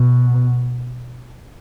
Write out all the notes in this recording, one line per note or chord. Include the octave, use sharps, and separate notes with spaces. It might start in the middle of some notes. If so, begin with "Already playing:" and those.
Already playing: B2